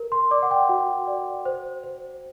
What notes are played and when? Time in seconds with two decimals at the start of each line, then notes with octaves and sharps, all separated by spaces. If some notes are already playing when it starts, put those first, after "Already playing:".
Already playing: A#4
0.12 C6
0.31 D5 D6
0.43 F#5
0.51 G5
0.69 F#4
1.07 D5
1.45 C5
1.83 C5